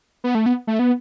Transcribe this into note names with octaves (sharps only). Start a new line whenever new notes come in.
B3
A3
B3
A3
B3